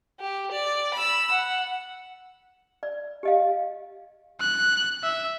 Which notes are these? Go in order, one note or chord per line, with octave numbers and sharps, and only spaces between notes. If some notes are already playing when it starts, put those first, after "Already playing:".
G4
D5
B5 E6
F#5
D5
G4 D#5 F5
F#6
E5